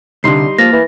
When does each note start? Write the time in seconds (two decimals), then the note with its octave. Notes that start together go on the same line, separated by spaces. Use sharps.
0.24 C2 D3 G3 D#4 C6 C7
0.59 F3 A#3 A6 A#6
0.73 E3